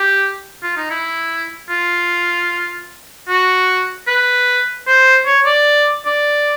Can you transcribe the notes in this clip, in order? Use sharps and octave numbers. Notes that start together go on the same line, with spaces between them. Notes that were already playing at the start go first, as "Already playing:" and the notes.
Already playing: G4
F4
D#4
E4
F4
F#4
B4
C5
C#5
D5
D5